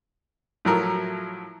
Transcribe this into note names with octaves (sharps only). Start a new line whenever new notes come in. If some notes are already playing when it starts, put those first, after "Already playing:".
A2 F3 F#3 A4 A#4